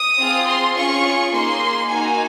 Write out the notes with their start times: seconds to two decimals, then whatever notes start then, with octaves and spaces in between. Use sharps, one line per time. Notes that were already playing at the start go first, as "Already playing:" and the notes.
Already playing: D#6
0.19 C4 F4 G#4
0.47 C6
0.76 C#4 F4 G#4 C#6
1.32 A#3 D#4 G#4 C6
1.89 A#3 D#4 F#4 G#5